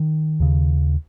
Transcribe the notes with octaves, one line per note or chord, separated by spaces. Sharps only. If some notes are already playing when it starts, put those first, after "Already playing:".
Already playing: D#3
D#2 C#3